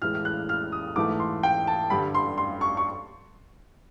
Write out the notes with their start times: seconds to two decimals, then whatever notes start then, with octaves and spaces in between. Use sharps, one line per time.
0.02 A2 E3 G#3 F6
0.15 F6
0.25 F#6
0.49 F6
0.72 D#6
0.96 G#2 E3 A3 D6
1.20 C6
1.43 G5
1.67 A5
1.90 G2 D3 G3 B5
2.15 C6
2.38 C6
2.61 C#6
2.77 C#6